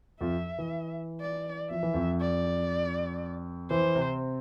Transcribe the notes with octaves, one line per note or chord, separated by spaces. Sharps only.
F2 F3 E5
E3
D5
F3 E5
E3
F2 F3
D5
E3 C5
C3 C4